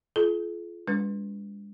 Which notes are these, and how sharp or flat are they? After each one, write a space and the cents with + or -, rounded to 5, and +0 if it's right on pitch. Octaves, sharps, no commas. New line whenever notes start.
F4 -15 G#4 +45
G#3 -40 D4 -40 B4 +0